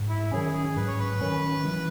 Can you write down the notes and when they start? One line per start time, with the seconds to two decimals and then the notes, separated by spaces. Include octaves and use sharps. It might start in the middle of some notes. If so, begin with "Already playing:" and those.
Already playing: G#2
0.09 E4
0.32 D#3 F#3 C#4 G#4
0.54 G#4
0.76 G#2 B4
0.87 C#5
1.00 B4
1.21 D#3 F#3 C#4
1.65 E3